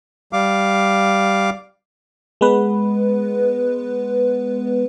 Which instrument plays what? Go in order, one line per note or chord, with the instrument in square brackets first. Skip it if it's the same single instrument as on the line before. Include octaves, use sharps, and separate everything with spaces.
[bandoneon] G3 F5 D6
[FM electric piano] G#3 B3 B4